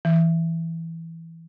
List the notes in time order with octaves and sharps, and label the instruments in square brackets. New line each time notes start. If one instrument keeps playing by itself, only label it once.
[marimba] E3